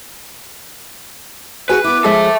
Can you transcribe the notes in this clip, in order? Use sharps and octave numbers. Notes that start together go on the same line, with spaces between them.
F#4 G#4 B4 G#5
B3 E4 D6
F3 G#3 G#4 A4 E5